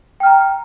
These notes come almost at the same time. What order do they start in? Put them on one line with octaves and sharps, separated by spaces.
G5 F6 A#5